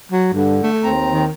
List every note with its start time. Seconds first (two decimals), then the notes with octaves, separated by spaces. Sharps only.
0.12 F#3
0.33 G2 D3
0.63 A3
0.84 D#2 C4 A#5
1.10 D#3